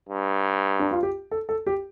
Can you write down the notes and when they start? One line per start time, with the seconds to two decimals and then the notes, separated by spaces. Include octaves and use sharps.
0.09 G2
0.79 D4
0.91 F4
1.03 G4
1.31 A4
1.49 A4
1.67 G4